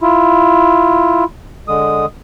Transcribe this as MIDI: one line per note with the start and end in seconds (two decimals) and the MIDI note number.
0.01 1.24 64
0.01 1.24 65
1.68 2.06 50
1.68 2.06 56
1.68 2.06 87